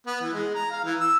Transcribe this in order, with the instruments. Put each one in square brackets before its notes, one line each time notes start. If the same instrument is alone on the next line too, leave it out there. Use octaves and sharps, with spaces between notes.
[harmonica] B3
E3
G#3
A#5
F5
E3
E6